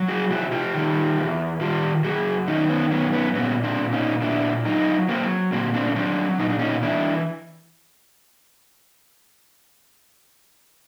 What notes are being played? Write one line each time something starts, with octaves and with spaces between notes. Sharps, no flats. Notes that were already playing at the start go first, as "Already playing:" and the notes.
Already playing: F#3
F#4 G#4
C3 E4 F#4
F4 G4
D#3
E2
D#3 F4 G4
F#2 F#4 G#4
D#3 C#4 D#4
B3 C#4
F#2 B3 C#4
B3 C#4
A#2 B3 C#4
C4 D4
A#2
C#4 D#4
A#2 D4 E4
F#3 D#4 F4
F#3 A#3 C4
A#2 A#3 C4
C4 D4
C#4
F#3 C4 D4
A#2 D#4
D4
C#4 D#4
E3 D4 E4